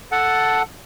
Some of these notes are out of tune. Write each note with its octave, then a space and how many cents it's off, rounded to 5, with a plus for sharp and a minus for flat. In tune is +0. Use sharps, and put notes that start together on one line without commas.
A4 +0 F#5 +0 A5 +0